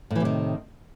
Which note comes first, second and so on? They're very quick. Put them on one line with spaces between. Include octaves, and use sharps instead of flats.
A2 E3 C3 D#3